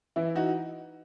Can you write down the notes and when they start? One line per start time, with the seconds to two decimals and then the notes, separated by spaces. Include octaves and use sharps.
0.16 E3 E4
0.35 D#4 F#4